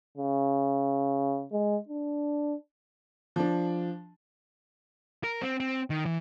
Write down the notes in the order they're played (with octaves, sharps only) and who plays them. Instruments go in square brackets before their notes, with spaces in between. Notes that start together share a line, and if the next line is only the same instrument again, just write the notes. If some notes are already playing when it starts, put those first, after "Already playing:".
[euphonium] C#3
G#3
D4
[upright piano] F3 D4
[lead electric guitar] A#4
C4
C4
D#3
E3